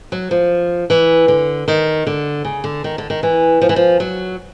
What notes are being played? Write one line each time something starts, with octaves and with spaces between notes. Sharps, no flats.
F#3
F3
E3
D3
D#3
D3
C#3
D3
D#3
D3
D#3
E3
F3
E3
F3
F#3